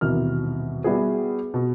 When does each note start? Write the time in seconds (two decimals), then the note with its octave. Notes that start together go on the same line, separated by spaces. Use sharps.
0.01 D#1 G#1 B2 E3 A#4 F6
0.84 G3 B3 E4 F#4 G#4
1.54 B2